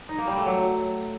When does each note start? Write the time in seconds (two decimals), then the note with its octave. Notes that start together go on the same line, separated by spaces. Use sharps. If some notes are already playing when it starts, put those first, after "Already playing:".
0.09 D#4
0.18 A#3
0.27 G3
0.37 A3
0.46 F#3